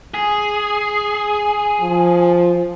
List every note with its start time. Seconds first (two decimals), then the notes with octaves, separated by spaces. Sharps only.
0.14 G#4
1.81 F3